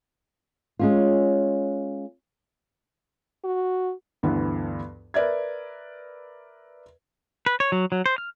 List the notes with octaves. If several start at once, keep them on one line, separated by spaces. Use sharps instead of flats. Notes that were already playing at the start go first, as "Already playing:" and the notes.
G#3 C#4 F4
F#4
D2 G2 E3 B3
A#4 B4 D5 E5 G#6
B4
C#5
F#3
F#3
C5
F6